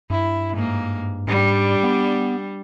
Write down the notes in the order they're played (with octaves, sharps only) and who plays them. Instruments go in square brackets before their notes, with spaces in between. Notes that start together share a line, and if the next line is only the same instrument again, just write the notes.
[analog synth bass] G2 [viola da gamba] E4
[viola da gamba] G#2 A#3
[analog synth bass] G#2 [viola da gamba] G3 D4
[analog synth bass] B3